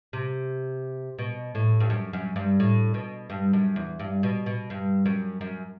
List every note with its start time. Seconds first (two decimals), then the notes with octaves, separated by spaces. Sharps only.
0.13 C3
1.18 B2
1.55 A2
1.80 G2
1.90 F#2
2.13 F#2
2.36 G2
2.60 A2
2.94 B2
3.30 G2
3.53 F#2
3.76 E2
3.99 G2
4.23 B2
4.46 B2
4.70 G2
5.06 F#2
5.41 F#2